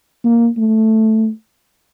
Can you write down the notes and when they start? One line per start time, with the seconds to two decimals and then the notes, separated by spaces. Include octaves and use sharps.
0.24 A#3
0.58 A3